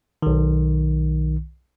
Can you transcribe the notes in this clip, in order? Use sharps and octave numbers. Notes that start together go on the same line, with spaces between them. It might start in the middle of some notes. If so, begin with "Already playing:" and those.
B1 D#3